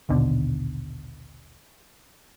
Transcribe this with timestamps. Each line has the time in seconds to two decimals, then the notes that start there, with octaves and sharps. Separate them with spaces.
0.09 A#1 D#2 B2 D3